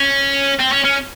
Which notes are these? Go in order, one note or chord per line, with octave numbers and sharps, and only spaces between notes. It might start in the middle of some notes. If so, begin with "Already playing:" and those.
Already playing: C#4
C4
C#4
C#4